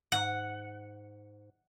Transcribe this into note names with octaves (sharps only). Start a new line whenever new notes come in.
G#2 F#5